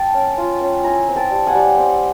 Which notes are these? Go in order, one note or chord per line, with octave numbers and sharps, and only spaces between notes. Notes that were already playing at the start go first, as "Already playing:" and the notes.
Already playing: G5 A5
C#4
F4
C#4
E4 G#5 A#5
C4
G5 A5
G3
F#5 G#5
G3
C4